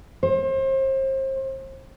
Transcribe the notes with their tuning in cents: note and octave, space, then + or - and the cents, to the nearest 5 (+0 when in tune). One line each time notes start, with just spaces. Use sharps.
C5 +35